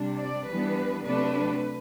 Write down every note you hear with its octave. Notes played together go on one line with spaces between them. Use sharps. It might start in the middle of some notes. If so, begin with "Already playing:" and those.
Already playing: C3 G3 D4
D5
E3 G3 B3 D4 B4
C3 F#3 A3 D4 B4